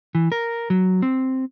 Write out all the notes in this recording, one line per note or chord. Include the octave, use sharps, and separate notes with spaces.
E3
A#4
F#3
C4